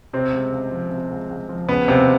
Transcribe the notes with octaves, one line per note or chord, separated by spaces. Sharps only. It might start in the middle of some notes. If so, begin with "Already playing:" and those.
C3 C4
C#2
C#2
F3
C3
C#2
C#2
F3
C#3 B3
D#2 C3 C4